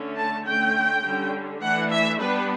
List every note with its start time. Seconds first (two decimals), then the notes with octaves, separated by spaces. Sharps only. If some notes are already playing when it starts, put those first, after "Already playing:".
Already playing: D3 A3 C#4
0.16 A5
0.45 D3 A3 C#4 G5
1.04 D3 G3 C#4
1.62 E3 A3 D4 F#5
1.91 E5
2.20 G3 B3 D4 B4